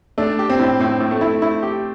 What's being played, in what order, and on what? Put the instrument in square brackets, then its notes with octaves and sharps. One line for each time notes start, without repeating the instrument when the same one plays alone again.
[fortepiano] A3 [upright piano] D4
[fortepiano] G4
[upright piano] C4
[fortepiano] A2
[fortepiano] A2 [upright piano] C4
[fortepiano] A2
[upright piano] A3
[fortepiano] E4
E4
G4